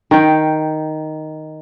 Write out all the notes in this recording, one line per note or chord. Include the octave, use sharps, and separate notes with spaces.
D#3 G5